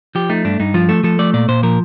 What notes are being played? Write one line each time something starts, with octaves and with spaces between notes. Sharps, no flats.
F3 G4
A3 D#4
G2 D4
G2 D#4
F3 F4
A3 A4
F3 A4
A3 D5
A#2 D5
A#2 C5
F3 A#4